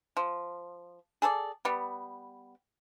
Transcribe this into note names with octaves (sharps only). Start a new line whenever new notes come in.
F3
G#4 A4 C5 D5
G3 B3